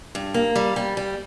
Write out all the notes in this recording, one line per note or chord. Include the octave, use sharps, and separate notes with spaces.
G2
A#3
G3
G3
G3